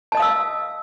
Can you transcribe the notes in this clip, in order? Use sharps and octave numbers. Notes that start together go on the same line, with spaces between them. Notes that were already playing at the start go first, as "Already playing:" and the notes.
D#5 F5 A5 D#6 E6